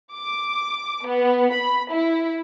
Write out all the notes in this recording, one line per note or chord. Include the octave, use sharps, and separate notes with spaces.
D6
B3
B5
E4